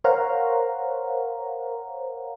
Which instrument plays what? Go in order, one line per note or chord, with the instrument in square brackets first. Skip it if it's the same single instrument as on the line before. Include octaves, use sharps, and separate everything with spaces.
[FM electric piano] A#4 C5 C#5 F5 F#5 A#5